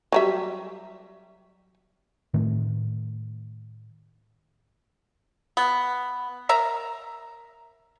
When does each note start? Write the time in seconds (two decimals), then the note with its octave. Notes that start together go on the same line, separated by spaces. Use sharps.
0.12 F#3 G3 E5
2.34 A2 D#3 A3
5.57 B3
6.49 A#4 E5 A#5